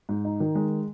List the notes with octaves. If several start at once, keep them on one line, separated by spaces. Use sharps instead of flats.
G#2
D#4
D#3
G#3